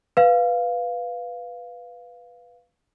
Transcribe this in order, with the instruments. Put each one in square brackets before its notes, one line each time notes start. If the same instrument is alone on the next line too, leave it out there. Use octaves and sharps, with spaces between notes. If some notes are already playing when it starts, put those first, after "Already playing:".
[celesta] B4 F5